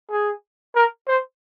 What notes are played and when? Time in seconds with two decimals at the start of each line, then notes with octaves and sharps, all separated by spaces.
0.11 G#4
0.75 A#4
1.08 C5